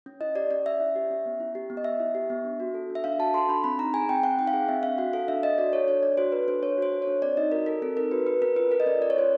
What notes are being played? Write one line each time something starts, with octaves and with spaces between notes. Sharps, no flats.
C#4
E4 D#5
G4 D5
C#4 D5
C#4 E5
E4
G4
C#4
B3
E4
G4
B3
D#5
B3 E5
E4
G4
B3
D4
F#4
A4
D4
E5
D4 F5
F#4 A5
A4 C6
D4 B5
C4 B5
D#4 A#5
G#4 G#5
C4 G5
C4 F#5
D#4 G5
F5
G#4 F#5
C4 E5
D4 F5
F#4 F#5
A4 F5
D4 E5
D4 D#5
F#4 D5
A4 C#5
D4 C#5
D4 D5
F#4 C5
A4 B4
D4 C5
D4 C#5
F#4 C5
A4
C#5
D4
C4 D5
D#4 D#5
F#4 A#4
A4 A#4
C4 A4
D#4 A#4
F#4 B4
A4 B4
C#4 A#4
F4 B4
A4 A#4
D#5
C#4 D5
C#4 D5
C#5
F4 C5